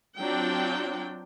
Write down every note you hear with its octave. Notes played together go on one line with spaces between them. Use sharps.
F#3 C4 D4 F4 G5